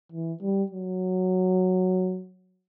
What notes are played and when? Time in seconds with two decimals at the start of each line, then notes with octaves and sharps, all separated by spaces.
0.12 E3
0.42 G3
0.72 F#3